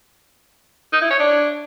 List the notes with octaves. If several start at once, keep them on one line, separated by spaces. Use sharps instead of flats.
D#4
E4
C#5
D4